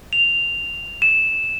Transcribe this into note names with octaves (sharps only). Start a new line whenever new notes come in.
F7
E7